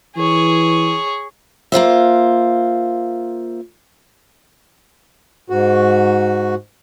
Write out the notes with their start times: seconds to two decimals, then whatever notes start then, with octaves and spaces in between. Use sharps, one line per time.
0.17 E3 G#4 C#5
1.72 A#3 F4 C5 E5
5.50 G#2 F#4